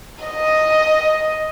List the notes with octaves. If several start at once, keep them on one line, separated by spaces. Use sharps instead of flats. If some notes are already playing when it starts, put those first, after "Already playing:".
D#5